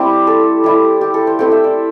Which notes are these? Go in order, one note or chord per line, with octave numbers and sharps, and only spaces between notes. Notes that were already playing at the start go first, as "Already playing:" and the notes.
Already playing: G3 C4 E4 G4
A4
G3 E4
G4
A4
C5
A3 C4 E4 G5
E5
D5